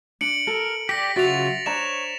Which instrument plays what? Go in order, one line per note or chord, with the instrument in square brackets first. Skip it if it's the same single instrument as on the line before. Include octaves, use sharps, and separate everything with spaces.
[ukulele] D4 [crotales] C#7 D7 F#7
[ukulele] A4 [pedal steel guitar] A#4
[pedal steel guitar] G4 D5 [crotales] A#6 B6
[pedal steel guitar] C#3 F#3 F4 [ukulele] F#4 E5 [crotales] A6 F7
[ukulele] D4 C5 A#5 [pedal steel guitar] C#5 [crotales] E7